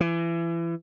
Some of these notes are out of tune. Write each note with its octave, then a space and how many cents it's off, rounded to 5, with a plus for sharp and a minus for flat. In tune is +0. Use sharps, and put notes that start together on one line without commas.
E3 +30